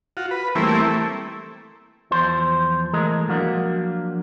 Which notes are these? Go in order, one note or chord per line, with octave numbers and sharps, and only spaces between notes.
F4 F#4
B4
E3 G3 A3 A#3 C4 E4
A3
E2 F3 C5 C6
E3 G#3 A3 A#4 D#5
F3 F#3 A#3 D4